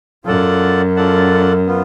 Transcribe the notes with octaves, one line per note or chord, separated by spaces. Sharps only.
F#2 F4 A4 D5 F#5 A5
F4 A4 D5 F#5 A5
B3 F4